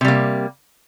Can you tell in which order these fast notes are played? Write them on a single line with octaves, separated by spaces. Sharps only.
C3 G3 A#3